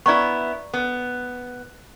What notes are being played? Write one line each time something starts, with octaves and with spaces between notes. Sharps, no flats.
B3 E4 D5 A#5 C#6
B3